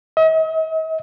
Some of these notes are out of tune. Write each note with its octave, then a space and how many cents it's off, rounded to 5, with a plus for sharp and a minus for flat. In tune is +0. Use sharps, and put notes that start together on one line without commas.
D#5 +45